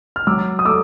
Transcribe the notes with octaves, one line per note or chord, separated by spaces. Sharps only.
F6
F#3 D6 E6
D#6
A3 D6 E6